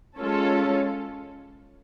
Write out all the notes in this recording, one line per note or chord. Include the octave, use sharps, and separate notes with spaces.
G#3 C#4 F4 A4 C#5